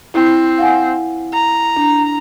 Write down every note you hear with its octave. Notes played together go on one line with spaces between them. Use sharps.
C4 E4
F5 F#5 G#5
A#5
D4